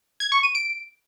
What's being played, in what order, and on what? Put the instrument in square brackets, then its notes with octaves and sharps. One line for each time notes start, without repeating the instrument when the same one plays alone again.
[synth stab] G#6
C#6
D#7
D7